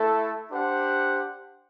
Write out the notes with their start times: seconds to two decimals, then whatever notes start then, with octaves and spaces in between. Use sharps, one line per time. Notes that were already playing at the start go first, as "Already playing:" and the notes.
Already playing: A3 E4 A4
0.51 D4 G4 C5 F#5